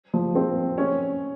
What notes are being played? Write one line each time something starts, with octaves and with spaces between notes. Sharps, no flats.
F3
C4
C#4